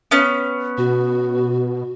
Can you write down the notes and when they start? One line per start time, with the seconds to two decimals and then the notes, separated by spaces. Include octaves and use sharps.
0.11 B3 C#4
0.78 B2 F#4